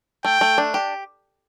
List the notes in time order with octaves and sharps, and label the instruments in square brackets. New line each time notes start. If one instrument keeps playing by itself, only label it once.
[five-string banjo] A3 [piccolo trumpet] G5
[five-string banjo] A3
D4
G4